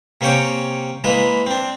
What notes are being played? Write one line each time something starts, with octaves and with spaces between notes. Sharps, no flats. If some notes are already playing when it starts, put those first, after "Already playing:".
C3 A#3 C#4 C#5 G5 D6
E3 G#3 A#3 B4
C4 D4